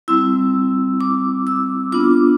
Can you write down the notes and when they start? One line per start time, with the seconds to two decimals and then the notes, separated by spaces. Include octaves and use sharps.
0.08 G3 C4 E4 E6
1.01 D6
1.47 E6
1.92 B3 D4 F4 D6